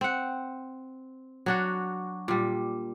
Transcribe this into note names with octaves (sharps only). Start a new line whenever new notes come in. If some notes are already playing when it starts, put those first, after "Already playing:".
C4 F#5
F#3 D4 F#4
A#2 G3